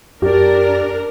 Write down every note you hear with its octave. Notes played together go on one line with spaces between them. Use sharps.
F#2 D4 G4 A#4 D5